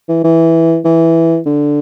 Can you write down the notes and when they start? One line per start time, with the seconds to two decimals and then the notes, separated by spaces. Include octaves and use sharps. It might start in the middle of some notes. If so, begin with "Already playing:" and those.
0.09 E3
0.24 E3
0.85 E3
1.46 D3